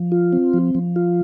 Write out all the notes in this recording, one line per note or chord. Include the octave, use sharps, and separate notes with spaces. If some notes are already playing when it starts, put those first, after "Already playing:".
Already playing: F3
F4
C4
F3
F3
F4